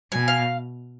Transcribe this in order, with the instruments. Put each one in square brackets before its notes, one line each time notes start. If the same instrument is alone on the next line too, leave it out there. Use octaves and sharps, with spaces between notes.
[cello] B2 [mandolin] G#5
[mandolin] F5